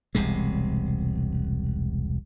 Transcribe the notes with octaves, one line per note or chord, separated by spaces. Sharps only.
E1 C2 C3 G#3